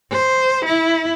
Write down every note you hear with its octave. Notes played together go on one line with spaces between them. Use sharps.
C5
E4